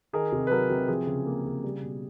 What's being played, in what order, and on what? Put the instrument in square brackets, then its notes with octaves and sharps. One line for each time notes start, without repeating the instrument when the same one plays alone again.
[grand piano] D#3 G#4 A#4
C3
B4
F#3 G#4 A#4
C3
F3 G#4
C#3
A#3
C#3
G3
B2